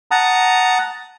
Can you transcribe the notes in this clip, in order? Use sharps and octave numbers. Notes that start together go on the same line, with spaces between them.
F#5 A5 A#5 D#6